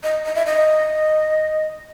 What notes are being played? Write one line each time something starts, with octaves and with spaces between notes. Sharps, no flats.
D#5
D#5
E5
D#5